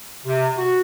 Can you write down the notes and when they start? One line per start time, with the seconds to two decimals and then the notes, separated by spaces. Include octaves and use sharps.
0.24 C3
0.57 F#4